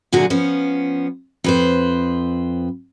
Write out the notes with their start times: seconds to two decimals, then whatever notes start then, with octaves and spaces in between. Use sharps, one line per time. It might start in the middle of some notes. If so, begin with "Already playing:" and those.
0.12 A#2 D3 E3 F#3 F#4 G#4
0.30 F3 B3 C#4
1.44 F2 B4 C5